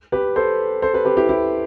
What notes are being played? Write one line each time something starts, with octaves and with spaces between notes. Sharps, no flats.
G4 B4
A4 C5
A4 C5
G4 B4
G4 B4
E4 G4
E4 G4